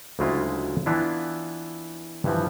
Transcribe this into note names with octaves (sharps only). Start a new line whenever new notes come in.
D2 C#3 F#3 G#3 E4 F4
E3 B3 D4 E4 F4
G2 E3 F3